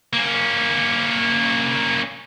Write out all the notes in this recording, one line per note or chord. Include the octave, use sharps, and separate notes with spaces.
A#3 C#4